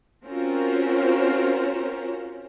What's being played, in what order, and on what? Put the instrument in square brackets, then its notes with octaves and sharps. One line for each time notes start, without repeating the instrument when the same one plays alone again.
[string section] C4 C#4 F4 F#4 A#4 C5